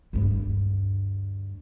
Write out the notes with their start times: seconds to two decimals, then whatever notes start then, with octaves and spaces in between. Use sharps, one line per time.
0.13 D2 G2